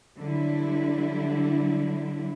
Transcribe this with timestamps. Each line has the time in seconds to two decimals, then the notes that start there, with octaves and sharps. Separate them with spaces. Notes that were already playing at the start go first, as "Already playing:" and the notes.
0.17 D3 F#3 G3 E4